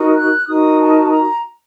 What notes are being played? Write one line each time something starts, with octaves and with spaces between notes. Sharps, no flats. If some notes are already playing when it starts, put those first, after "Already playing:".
Already playing: D#4 F#4 A#4
F#6
D#4 F#4 A#4 D#6
A5
A#5